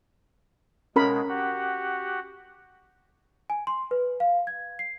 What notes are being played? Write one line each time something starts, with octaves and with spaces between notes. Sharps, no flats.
B2 G#3 C#4 A#4 B5
F#4 G4 F#5
G#5
C6
B4
F5
G#6
C7